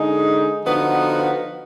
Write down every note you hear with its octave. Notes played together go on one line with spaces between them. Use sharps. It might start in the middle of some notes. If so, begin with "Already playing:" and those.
Already playing: D3 G#3 D#4 G#4
D3 F3 B3 D#4 F#4